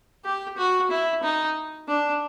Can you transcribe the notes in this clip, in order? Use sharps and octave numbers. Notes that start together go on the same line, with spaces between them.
G4
F#4
E4
D#4
D4